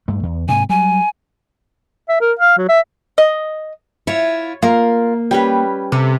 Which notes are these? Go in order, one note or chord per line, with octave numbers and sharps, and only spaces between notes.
G2 A3
E2
G#2 C3 G#5
F#3 G3 G#5
E5
A#4
F5
F#3
E5
D#5
E4 F4 C#5
A#3 F4 A#4
G3 C#4 B4 G5
C3 A4